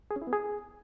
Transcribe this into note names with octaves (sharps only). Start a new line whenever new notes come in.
G#4
C#4
E4
B3
G#4